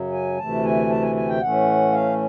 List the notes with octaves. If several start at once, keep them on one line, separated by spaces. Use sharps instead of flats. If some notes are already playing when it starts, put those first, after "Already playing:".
Already playing: F#2 C#3 F#3
G#5
D2 C3 E3 A3 A5
G#5
A5
G#5
G#5
G5
A2 E3 A3 C#4 F#5
F5